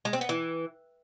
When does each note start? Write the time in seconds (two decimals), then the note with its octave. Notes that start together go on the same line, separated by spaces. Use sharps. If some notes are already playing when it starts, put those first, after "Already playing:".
0.05 G#3
0.13 C4
0.21 B3
0.29 E3